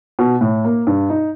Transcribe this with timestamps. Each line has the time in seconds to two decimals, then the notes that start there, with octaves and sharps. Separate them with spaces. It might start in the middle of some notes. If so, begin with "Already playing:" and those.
0.19 B2
0.41 A2
0.64 A#3
0.87 G2
1.10 D#4